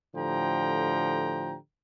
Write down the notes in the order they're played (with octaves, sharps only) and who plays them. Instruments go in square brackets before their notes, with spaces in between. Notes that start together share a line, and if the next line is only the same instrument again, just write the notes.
[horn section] A2 D3 F3 G4 G5 A#5